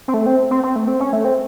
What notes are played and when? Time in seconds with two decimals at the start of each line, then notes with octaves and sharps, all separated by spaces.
0.08 C4
0.14 A3
0.26 C4
0.51 C4
0.63 C4
0.76 A3
0.88 C4
1.00 C#4
1.13 A3
1.25 C4